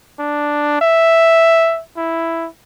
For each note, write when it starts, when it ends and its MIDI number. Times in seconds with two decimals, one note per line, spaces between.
0.19 0.80 62
0.81 1.81 76
1.97 2.48 64